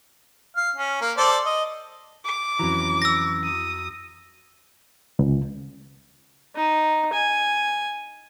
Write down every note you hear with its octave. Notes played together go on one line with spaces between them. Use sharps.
F5
C#4
A#3
A4 C5 D5
D#5
D6
F2 E3 F#3 C#4 F#4 A#5
E6 A#6
D#6
C#2
D#4
G#5